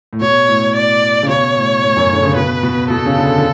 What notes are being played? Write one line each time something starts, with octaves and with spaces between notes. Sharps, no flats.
A2
B2 C#5
A2
D5
C#3
B2 C#5
A2
A2
F#2
D3
C#3
B2 B4
B2
B2 A4
C#3
D3
D3